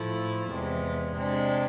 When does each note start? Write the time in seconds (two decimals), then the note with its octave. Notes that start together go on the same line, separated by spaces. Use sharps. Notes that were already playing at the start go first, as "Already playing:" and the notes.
Already playing: A2 F3 A3 E4
0.48 E2 C3 G#3
1.16 C3 G#3 D4